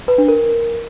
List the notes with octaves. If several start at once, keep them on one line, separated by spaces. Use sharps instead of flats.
B4
D4
A#4